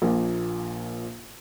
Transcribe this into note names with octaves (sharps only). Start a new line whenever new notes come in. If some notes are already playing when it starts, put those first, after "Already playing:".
A#1 A#2